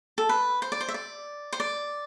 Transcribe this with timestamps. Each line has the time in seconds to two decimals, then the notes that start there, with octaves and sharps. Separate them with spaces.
0.18 A4
0.29 B4
0.62 C5
0.72 D5
0.81 C5
0.88 E5
0.94 D5
1.53 C5
1.60 D5